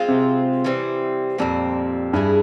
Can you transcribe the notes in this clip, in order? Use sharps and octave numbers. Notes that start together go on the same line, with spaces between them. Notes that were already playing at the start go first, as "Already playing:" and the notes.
Already playing: G#3 C4 F4
C3
E3 G3 C4
F2 A#2 G3 C4
G2 G#3 E4 G#4